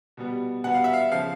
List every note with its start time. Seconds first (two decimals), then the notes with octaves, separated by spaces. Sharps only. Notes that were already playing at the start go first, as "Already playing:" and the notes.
0.17 B2 G3 B3
0.64 B2 G3 B3 F#5
0.74 F5
0.84 E5
0.93 F5
1.12 C#3 F3 F5